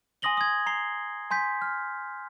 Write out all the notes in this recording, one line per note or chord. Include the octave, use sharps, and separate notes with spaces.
G#5 C6 D#6 A#6 F#7 G7
D#6 G#6
A#5 C7 G7
G#5 C6 G6 B6
F6